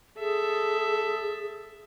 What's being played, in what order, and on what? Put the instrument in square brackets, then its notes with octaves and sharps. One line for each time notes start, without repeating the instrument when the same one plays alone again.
[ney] G#4 [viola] A4 E5